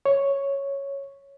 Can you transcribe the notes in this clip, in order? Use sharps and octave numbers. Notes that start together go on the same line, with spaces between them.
C#5